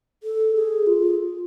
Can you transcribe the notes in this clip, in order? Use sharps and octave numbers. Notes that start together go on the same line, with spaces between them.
A4
G#4
F4